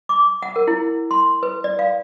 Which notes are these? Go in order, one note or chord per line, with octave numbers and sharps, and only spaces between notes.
D6
F#5
A#4
E4
C6
B4
D5
F5